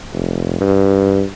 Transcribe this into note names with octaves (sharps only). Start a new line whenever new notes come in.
F1
G2